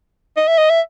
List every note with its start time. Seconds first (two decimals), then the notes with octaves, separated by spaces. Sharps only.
0.37 D#5
0.48 E5
0.58 D#5
0.70 E5